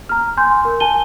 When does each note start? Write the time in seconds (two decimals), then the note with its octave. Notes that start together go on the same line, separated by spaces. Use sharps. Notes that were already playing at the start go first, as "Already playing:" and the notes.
0.09 A#5 F6
0.37 G#5 C6 G6
0.65 A#4
0.80 G#5 A5 D#7 G7